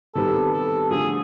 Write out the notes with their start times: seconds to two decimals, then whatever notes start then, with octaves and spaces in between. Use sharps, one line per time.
0.15 C3 D#3 G3 B3 A4
0.53 A4
0.91 D3 F3 A3 G#4